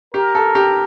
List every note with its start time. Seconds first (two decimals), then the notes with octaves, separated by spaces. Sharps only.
0.14 G4 A#4
0.35 A4
0.55 G4